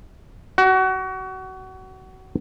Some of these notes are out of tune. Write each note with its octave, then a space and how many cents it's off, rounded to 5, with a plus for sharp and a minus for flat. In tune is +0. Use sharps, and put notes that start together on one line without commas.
F#4 +25